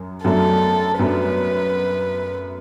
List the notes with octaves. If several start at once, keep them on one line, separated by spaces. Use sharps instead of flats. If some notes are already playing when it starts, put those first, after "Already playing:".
Already playing: F#2 F#3
F#2 F#3 A3 D4 A4
F#2 F#3 A3 D4 B4